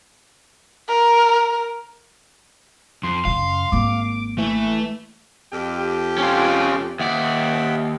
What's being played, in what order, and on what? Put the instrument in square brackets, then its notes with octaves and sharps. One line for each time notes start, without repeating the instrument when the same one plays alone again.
[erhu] A#4
[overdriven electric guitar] F2 [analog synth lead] C6
[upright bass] F#2 C#3 [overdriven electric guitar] F5
[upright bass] G#1 A#3 [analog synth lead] D6
[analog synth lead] E3 [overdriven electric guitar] A3
[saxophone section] F2 G4
[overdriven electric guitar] C#4 F4
[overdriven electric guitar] D#2 D5 [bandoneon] E5 F#5 G5